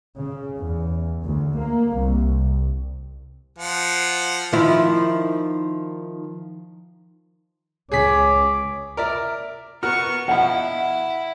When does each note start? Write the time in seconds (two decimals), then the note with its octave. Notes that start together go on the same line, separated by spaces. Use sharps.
0.20 C#3
0.58 E2
1.24 D2
1.56 A#3
1.94 C2
3.58 F3 F#5
4.52 D#3 F3 E4
7.92 C#2 G#4 C#5 D6 B6
8.97 A#4 D5 E5
9.83 B3 F#4 A#4 C#6 F6
10.28 B2 F3 E4 F#5